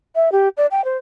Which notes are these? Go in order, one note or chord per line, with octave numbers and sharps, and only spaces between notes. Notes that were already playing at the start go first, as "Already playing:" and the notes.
E5
G4
D5
G5
C5